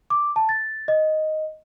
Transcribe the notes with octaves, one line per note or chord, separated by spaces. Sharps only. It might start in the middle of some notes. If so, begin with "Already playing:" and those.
D6
A5
A6
D#5